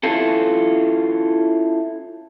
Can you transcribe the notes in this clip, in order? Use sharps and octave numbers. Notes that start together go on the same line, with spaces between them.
C#4 E4 F4 A4